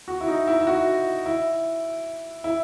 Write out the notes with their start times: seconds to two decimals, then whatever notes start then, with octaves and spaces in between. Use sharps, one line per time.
0.08 F#4
0.21 E4
0.28 D#4
0.47 E4
0.60 E4
0.67 F#4
1.26 E4
2.44 E4